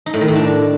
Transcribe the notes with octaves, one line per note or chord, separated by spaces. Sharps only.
D#4
A2
D#3
A2
D4